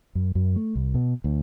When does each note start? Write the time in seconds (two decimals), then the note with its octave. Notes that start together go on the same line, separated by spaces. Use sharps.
0.15 F#2
0.35 F#2
0.56 A3
0.75 C2
0.94 B2
1.24 D2